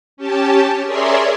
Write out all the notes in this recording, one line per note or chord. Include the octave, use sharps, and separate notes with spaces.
C#4 G4 A5
G#4 A#4 C#5 D5 E5 C6